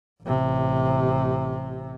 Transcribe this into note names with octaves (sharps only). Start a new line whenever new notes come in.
A1 C3